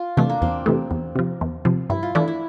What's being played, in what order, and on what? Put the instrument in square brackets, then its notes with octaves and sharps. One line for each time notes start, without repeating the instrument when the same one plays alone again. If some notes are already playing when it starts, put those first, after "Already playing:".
Already playing: [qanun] F4
[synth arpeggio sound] C3 E3 A3 [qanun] D4
[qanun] A#3
[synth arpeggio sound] E2 [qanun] C4
[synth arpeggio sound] C3 E3 A3
E2
C3 F3
E2
C3 F3
[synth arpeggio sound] G2 [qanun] E4
[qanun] F4
[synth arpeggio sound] E3 A3 D4 [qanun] E4
[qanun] E4